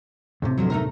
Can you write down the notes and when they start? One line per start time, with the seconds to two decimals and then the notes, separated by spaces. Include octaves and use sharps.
0.42 D#2 A2 C3
0.58 D3 F3 F#3
0.70 A3 D#4 A#4